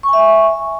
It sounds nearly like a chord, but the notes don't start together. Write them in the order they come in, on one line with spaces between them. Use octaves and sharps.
C#6 G#5 E5